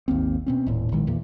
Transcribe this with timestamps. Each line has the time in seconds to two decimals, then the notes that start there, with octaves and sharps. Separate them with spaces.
0.08 G#1 D#2 A#3 C4
0.46 B2 C4 C#4
0.67 D#1 A2
0.92 A#1 D#3 G#3
1.07 E2 A#2